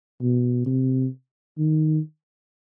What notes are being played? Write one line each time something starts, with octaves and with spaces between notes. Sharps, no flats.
B2
C3
D#3